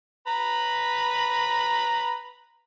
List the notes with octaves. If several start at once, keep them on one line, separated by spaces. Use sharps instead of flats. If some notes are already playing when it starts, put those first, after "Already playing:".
B4 A#5 B5